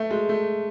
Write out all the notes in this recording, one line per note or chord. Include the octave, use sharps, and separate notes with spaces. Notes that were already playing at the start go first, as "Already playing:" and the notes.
Already playing: A3
G#3
A3